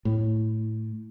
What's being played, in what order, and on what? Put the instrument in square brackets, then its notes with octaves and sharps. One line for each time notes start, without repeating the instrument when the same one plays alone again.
[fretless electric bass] A2